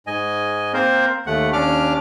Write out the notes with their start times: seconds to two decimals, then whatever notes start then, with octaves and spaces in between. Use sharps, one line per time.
0.07 G#2 D#5 G#5
0.73 A#3 C4 A#4 C5
1.26 D#2 A3 F#5
1.53 D#2 C#4 D4 D6 F6